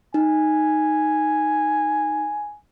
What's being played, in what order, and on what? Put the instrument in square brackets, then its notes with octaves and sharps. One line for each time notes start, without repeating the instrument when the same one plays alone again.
[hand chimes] D#4 [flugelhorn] G#5